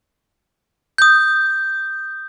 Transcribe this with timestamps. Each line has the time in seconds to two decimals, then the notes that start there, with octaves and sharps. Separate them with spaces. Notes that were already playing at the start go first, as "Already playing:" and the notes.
0.98 D#6 G6